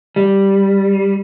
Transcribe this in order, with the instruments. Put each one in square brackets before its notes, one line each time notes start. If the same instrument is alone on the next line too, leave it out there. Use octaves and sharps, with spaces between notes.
[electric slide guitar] G3